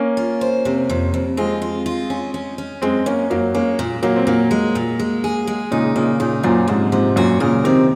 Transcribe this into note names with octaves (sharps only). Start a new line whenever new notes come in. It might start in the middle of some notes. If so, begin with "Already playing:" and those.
Already playing: A#3 C#4
F4
C5
C3
F2
F2
G#3 C4 F4
F4
F4
C#4
C#4
C#4
F#2 G#3 C4
F#2 A#3 C#4
F#2 F#3 A#3
G#3 A#3 C#4
A#2
A#2 F#3 A#3
C4
A#2 F#3 A#3
G#3
A#2
G#3
G#4
G#3
A#2 C#3 D#4
A#2 C#3 A#3
A#2 C#3 D#4
F#2 A#2 F3
G#2 C3 F3
G#2 C3 F3
F#2 A#2 F#4
A#2 C#3 A#4
C3 D#3 C4